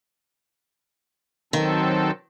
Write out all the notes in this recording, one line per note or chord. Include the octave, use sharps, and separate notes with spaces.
D#3 F#3 C4 A4